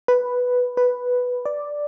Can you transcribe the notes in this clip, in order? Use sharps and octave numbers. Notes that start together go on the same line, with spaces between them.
B4
B4
D5